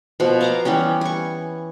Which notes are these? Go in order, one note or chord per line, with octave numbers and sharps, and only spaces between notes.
B2 F3
F5 A#5 D6
E3 G3 B3 C#4
G#5 C#6